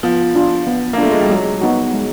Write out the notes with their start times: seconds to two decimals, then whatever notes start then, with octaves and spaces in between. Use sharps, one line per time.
0.03 F3 B3
0.35 D4 F4
0.67 B3
0.93 A#3
0.98 A3 D4 F4
1.12 G#3
1.21 G3
1.30 F#3 G#3
1.61 B3 D#4 F#4
1.94 G#3